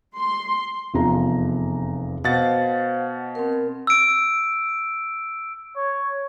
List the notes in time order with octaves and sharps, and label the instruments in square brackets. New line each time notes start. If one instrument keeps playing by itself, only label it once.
[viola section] C6
[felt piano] F1 E2 F3 A#5
[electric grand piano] B2 F#5 A6 [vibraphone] C5 F5
[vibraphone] C4 A#4
[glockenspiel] E6 D7
[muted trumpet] C#5